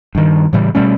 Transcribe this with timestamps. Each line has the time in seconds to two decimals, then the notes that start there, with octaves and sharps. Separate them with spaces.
0.15 G2 D#3
0.53 A2 C#3 E3 G3
0.75 B2 G3 A3 C#4